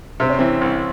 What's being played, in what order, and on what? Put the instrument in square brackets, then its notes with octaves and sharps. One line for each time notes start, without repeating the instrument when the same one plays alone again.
[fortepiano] C3 [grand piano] C4
[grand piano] C#4
[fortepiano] E3 [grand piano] C4
[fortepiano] C2